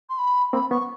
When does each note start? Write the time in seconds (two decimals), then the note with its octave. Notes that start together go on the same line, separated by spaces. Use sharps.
0.09 C6
0.18 B5
0.53 A#3 C4 B5
0.70 B3 C#4 C#6